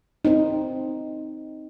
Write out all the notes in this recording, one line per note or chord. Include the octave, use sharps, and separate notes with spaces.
C4 D#4